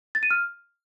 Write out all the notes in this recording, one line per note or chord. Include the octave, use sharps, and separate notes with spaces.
A6
D#7
F6